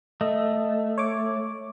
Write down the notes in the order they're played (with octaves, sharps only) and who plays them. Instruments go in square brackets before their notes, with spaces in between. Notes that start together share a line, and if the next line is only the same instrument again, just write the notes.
[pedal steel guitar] A3 [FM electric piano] D#5
[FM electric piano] C#5 D6